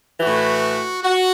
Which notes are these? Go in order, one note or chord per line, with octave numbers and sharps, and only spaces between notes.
A2 E3 F#4
F#4